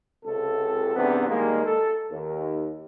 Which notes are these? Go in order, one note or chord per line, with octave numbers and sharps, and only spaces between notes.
C#2 C3 A4
E2 G#2 C3 B3 C4 D4
D#3 G3 G#3 A#3
A4
D#2